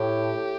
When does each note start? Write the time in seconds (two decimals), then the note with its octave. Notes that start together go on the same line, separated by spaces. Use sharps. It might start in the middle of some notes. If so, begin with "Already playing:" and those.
Already playing: A2 G4
0.36 A2